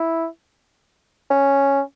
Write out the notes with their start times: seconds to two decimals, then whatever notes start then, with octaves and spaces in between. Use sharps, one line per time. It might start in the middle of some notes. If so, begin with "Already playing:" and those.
Already playing: E4
1.30 C#4